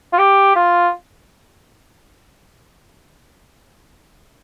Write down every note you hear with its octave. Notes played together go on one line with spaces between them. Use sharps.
F4
G4
F4